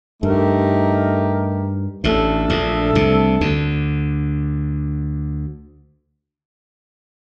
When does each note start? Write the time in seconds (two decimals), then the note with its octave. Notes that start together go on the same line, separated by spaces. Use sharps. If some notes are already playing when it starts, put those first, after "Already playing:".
0.23 G2 A3 D#4 G4 A#4
2.04 A1 A2 A3 D4 A4
2.50 A#1 A#2
2.95 C2 C3
3.41 D2 D3